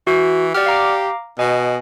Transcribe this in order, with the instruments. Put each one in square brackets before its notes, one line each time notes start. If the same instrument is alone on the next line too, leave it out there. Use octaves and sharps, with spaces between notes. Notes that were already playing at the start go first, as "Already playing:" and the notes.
[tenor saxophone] E3 [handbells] F#4
[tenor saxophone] G4 [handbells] D5 F#5 F6
[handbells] F5 A#5 D6
[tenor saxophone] B2 [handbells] D#5 G#5